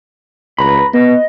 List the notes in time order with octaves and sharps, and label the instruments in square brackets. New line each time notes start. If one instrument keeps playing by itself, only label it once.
[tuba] C#2 [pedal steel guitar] B4 A#5 B5
[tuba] B3 [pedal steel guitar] D#5